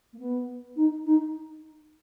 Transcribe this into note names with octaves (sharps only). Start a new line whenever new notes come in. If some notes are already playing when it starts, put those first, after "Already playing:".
A#3
B3
D#4
D#4